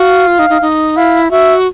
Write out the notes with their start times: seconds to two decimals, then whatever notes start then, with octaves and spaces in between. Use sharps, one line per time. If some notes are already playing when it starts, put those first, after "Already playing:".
Already playing: F#4 F5
0.27 F4
0.39 D#4
0.50 D#4
0.62 D#4
0.97 E4 F5
1.31 F#4 E5